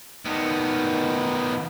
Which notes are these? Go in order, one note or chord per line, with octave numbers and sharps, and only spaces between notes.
D#3 B3